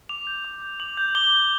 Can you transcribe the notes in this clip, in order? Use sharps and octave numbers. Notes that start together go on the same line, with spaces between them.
D6 F7
G6
D6
G6
D6 F#7
G6
D6 G7
G6